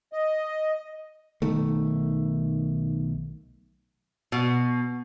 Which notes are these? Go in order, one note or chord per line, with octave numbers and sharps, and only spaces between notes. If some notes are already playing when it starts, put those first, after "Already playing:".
D#5
B1 D#3 A3
B2